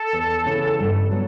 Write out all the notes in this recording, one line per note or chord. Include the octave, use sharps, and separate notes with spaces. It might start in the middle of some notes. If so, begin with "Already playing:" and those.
Already playing: A4
E2
C#3 E3
G2
F#3 B3